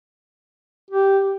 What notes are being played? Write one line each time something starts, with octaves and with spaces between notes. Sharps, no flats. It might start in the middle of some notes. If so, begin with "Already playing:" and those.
G4